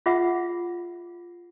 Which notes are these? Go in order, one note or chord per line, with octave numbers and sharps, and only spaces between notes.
F4 G#4 E5 F#5